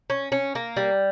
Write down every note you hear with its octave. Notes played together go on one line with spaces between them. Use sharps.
C#4
C#4
A#3
G3